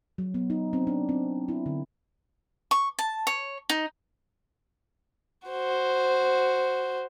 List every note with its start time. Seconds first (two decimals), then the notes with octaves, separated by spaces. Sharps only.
0.18 F#3
0.34 B3
0.50 D#4
0.73 C4
0.87 D4
1.09 C4
1.48 E4
1.66 D3
2.71 C#6
2.99 A5
3.27 C#5
3.70 D#4
5.48 F#4 C5